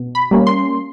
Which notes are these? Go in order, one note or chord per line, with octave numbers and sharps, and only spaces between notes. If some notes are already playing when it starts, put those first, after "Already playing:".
Already playing: B2
B5
G3 A#3 C#4
C6